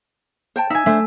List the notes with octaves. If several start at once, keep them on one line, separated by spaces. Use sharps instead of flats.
C5 G5 A5
D#4 E5 G#5
A3 D4 C5 E5